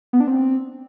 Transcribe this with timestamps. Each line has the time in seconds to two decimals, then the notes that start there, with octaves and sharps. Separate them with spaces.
0.13 B3
0.20 D4
0.27 C4